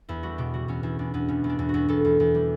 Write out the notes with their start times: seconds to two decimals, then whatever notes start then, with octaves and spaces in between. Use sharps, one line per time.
0.09 E2 E4
0.23 G3 F#4
0.38 B2 G4
0.54 G3 F#4
0.68 E2 C#4
0.83 E2 E4
0.99 E2 D4
1.14 E2 B3
1.28 B2 C#4
1.44 E2
1.49 D4
1.59 E2
1.69 F#4
1.74 E2
1.89 E2 A4
2.05 E2
2.20 E2
2.35 G3